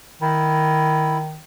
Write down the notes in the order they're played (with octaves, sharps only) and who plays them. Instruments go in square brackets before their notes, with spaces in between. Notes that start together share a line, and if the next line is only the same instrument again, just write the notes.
[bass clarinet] D#3 [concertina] E4